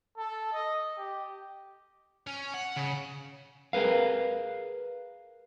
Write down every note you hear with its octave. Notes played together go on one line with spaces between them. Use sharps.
A4
D#5
G4
C#4
F#5
C#3
G#4 A#4 B4 F5